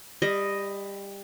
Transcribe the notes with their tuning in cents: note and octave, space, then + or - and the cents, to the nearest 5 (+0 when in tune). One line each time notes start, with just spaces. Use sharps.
G3 +20 D#5 +0